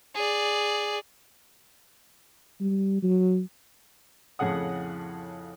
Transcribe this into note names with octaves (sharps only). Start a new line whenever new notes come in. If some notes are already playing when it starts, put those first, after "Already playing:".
G#4 D5
G3
F#3
F2 A2 C#3 G#4 F#5 D#6